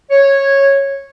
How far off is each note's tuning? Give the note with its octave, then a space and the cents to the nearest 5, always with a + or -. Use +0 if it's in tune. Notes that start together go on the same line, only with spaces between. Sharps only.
C#5 -10